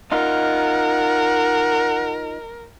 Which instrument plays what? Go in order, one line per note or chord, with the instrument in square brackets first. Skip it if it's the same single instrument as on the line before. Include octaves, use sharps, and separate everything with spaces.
[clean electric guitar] D#4 F4 [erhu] A#4 [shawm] F#5